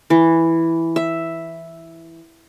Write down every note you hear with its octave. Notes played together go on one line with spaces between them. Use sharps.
E3
E5